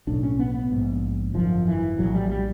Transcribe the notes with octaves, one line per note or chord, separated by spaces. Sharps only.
B1 A2 D4
C#4
B3
B3
A#1 G#2
G#1 F#2 D3 F3
E3
A#1 A2 F#3
G3
G3